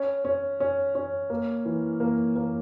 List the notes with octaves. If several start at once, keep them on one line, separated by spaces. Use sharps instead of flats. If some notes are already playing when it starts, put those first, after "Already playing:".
Already playing: C#4
C#4
C#4
C#4
A#3
E3
A#3
A#3